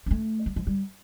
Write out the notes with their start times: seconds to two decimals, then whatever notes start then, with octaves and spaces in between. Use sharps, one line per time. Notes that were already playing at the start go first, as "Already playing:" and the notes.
0.06 C4
0.11 A3
0.46 G3
0.56 F3
0.67 G3